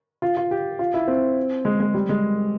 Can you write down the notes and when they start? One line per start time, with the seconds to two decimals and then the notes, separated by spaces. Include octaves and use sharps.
0.22 F4
0.37 F4
0.51 G4
0.79 F4
0.94 E4
1.07 C4
1.65 G#3
1.80 G#3
1.94 G3
2.09 G#3